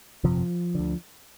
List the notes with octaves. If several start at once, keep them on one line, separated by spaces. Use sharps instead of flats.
G1 F2 C3 F3
D2 D3